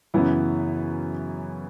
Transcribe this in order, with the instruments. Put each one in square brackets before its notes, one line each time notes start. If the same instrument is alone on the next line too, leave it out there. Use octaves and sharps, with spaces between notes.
[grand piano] F#2 C#3 E3 B3 E4